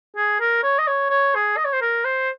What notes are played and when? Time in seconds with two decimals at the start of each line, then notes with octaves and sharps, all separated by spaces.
0.16 G#4
0.40 A#4
0.63 C#5
0.79 D#5
0.87 C#5
1.10 C#5
1.35 G#4
1.57 D#5
1.65 C#5
1.73 C5
1.81 A#4
2.05 C5